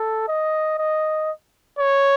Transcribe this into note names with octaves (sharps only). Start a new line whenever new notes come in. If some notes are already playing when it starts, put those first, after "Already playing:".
Already playing: A4
D#5
D#5
C#5